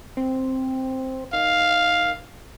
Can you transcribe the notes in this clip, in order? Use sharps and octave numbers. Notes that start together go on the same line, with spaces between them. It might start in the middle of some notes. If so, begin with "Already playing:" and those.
C4
D#3 F5